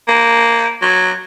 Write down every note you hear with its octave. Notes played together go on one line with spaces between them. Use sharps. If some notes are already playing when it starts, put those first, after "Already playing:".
A#3
F#3